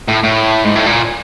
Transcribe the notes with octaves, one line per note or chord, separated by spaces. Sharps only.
A2
A2
G#2
A2
A#2